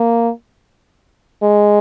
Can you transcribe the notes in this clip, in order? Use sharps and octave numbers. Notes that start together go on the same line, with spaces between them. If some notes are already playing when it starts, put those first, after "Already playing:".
Already playing: A#3
G#3